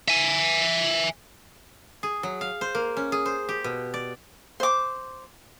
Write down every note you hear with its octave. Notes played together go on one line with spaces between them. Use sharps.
E5 G#5
G#4
F#3
F5
C5
A#3
C#4
G#4
C5
G4
B2
D5
C5 D6